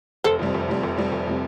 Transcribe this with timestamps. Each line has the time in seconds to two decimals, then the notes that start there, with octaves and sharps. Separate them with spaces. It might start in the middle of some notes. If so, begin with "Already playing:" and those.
0.24 F1 A4 C5
0.39 F2 C3 G3
0.54 F1
0.68 F2 C3 G3
0.83 F1
0.98 F2 C3 G3
1.12 F1
1.27 C3 G3